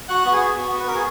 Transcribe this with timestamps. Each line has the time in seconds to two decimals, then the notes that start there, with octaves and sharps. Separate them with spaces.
0.09 F#4 F#5
0.25 B3 F#4
0.33 G#4
0.41 F#4
0.57 B3 F#4
0.72 B3
0.80 B4
0.87 B3 A#4
0.95 G#4